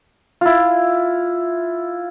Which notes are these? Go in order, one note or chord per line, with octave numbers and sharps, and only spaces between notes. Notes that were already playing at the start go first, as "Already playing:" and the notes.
E4 F4